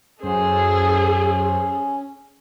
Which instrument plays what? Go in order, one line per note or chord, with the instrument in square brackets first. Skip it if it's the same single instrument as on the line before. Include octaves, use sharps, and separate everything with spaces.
[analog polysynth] F#2 C5 [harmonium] C#4 [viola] G#4 A4